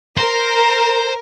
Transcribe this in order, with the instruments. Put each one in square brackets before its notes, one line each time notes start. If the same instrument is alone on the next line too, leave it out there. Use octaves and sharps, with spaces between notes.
[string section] A#4 [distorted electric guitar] C5